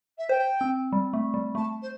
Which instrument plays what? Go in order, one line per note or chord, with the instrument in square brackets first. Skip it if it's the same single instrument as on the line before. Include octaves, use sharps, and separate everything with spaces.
[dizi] E5
[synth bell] C5 [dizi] G5
[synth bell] C4
G3
A3
G3
[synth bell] A3 [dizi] A5
[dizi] C5